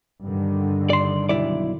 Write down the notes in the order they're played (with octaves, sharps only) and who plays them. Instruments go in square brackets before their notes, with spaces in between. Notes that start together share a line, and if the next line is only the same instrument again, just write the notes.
[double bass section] G2 D3 D#3
[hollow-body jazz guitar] D5 C6
B1 E4 D5